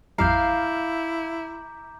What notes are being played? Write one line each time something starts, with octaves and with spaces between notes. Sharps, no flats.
A1 F2 G3 E4 F5 A#5 D6 G6